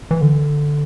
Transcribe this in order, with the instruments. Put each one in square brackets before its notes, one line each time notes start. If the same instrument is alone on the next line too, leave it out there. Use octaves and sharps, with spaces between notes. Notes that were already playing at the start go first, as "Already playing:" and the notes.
[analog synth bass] E3
D3